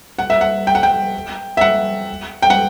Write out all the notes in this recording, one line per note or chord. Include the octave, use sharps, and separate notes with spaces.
F#5
E5
F#5
G5
F#5
G5
E5
F#5
G5
F#5